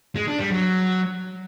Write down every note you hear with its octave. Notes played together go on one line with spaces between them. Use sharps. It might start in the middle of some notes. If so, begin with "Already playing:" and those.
G#3
D4
G3
F#3